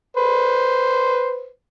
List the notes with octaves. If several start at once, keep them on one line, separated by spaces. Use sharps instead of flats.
B4 C5